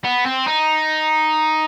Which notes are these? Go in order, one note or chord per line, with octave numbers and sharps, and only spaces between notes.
B3
C4
D#4